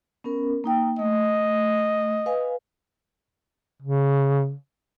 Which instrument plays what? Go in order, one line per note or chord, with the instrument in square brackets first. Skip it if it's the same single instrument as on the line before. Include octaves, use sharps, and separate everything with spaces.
[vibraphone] B3 C#4 A#4
A#3 D#4 G5
[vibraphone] A3 [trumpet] D#5
[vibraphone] B4 F5 G#5
[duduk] C#3